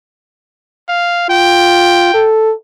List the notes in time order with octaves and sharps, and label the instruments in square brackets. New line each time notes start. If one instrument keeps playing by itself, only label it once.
[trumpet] F5
[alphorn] F4 [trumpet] G5
[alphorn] A4